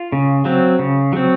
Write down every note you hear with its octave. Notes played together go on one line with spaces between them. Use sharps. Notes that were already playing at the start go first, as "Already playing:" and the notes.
Already playing: F4
C#3
F#3 C4
C#3
F#3 C4